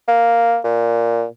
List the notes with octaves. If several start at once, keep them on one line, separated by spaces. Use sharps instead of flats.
A#3
A#2